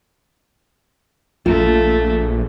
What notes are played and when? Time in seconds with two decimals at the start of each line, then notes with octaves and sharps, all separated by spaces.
1.46 A#1 A3 F4